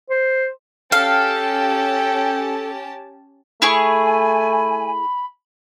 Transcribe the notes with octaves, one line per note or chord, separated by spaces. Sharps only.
C5
C#4 G4 A4 F5 G5 A5
A3 E4 G#4 G#5 B5 C#6